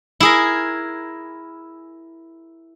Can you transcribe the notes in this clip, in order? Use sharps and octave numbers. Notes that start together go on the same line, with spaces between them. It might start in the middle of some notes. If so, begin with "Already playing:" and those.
E4 G#4 A#4